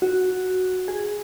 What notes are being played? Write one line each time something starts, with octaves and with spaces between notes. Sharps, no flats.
F#4
G#4